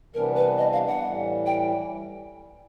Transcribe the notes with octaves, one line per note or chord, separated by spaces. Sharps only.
C3 E3 G3 B3 D4 A#4
B4
D#5
F5
F#5
A2 E3 G3
G5